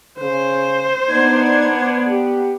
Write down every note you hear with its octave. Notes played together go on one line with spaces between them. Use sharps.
C#3 C5
B3 D4 D#4 G#6
G4